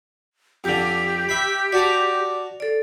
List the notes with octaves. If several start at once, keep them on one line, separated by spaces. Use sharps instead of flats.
F2 D3 G4
E5 B5
F#4 D5 A5 A#5 D6
A4 D5